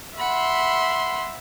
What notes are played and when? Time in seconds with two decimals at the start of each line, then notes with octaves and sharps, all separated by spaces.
0.18 E5 F#5 B5 C6